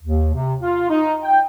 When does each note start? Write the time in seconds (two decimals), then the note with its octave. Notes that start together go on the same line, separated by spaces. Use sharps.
0.02 D#2
0.34 C3
0.62 F4
0.90 D#4
1.23 G5